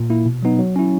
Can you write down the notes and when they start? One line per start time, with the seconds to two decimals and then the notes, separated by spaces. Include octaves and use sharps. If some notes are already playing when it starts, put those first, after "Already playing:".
Already playing: A#2
0.10 A#3 E4
0.26 B2
0.43 F#3 B3 D#4
0.59 F#3
0.76 C#4 E4